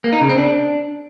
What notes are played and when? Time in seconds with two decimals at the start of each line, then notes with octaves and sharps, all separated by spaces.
0.04 A#3
0.13 D#4
0.21 C#3
0.29 C4
0.38 D4